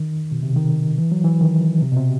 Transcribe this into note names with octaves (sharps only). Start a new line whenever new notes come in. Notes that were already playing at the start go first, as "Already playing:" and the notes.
Already playing: D#3
B2
C3
D#3
E3
F#3
E3
D#3
C3
B2
C3